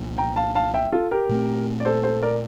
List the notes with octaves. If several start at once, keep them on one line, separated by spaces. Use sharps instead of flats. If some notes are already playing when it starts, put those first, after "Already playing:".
Already playing: C2 A#2 F3
G5 A#5
F5 A5
F5 A5
E5 G5
F4 A4
G4 A#4
A#2 A3 C4
D5
A4 C5
A4 C5
A#4 D5